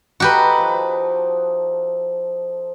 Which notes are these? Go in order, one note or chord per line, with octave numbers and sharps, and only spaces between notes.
D#4 F#4 G4 A4 B4
F3